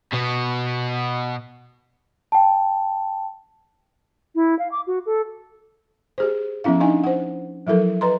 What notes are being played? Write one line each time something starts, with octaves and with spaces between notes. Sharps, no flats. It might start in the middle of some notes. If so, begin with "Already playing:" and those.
B2 B3
G5 A5
E4
F5
D6
F#4
A4
G4 G#4 C5
F3 B3 C#4 E4 F5
D4 D#4 D#5 F5 G#5
C5 F#5
F3 F#3 E4 A4 A#4
B4 D#5 A#5 C6